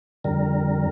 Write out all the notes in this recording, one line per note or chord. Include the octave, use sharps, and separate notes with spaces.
F2 D3 G3 A#4